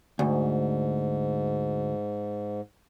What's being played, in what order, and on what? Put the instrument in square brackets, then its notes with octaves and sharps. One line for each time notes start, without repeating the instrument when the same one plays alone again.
[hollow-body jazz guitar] D2 [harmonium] G#2